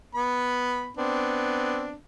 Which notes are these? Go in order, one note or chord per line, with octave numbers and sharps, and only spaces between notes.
B3 B5
B3 C4 D4